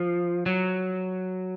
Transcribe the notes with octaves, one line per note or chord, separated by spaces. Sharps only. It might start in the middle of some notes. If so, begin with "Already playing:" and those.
Already playing: F3
F#3